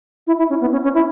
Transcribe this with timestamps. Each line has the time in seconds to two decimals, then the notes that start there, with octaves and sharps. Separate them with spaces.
0.27 E4
0.38 E4
0.49 C#4
0.61 B3
0.72 C#4
0.83 C#4
0.95 E4